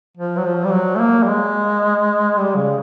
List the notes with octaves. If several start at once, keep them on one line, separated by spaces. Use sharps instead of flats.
F3
F#3
F3
G3
F#3
A3
A#3
G3
G#3
G3
C#3